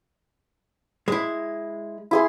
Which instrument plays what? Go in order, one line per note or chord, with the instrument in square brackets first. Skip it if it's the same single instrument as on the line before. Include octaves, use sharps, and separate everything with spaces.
[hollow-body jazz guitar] G#3 E4
[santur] E4 G#4 C6